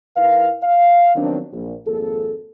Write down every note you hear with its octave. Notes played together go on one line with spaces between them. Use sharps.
G#2 E4 A#4 B4 F5
F5
D#3 F3 F#3 B3 C4 D4
A#1
G#1 F2 A#3 G#4 A4